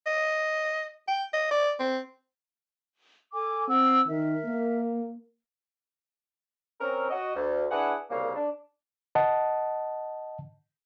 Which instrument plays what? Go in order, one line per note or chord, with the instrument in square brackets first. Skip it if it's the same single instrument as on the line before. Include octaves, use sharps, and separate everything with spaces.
[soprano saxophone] D#5
G5
D#5
D5
C4
[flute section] A4 G#5 D6
[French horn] C4 [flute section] F#5 E6
[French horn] D#3 [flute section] A#4 E5
[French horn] A#3
[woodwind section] C4 C#4 A#4
F#4 D#5
D2
D4 E4 G#4 B4 F#5
C2 A#2 C#3 A#3
D4
[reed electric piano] D#5 F#5 A5